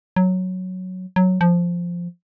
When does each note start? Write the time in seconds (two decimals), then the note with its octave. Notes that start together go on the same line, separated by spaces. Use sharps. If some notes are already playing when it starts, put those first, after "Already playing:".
0.16 F#3
1.16 F#3
1.41 F3